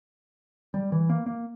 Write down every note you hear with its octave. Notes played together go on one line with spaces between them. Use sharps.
G3
E3
A#3
A#3